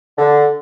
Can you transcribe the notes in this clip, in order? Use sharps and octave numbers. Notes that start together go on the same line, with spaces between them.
D3